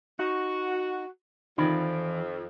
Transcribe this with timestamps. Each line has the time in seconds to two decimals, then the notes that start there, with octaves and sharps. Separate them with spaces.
0.19 D#4 F#4
1.58 F2 D#3 E3 D5 B5